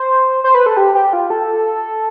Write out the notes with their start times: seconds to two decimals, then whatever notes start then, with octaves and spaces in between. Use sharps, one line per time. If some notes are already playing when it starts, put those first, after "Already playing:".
Already playing: C5
0.44 C5
0.55 B4
0.66 A4
0.77 G4
0.95 G4
1.13 F4
1.30 A4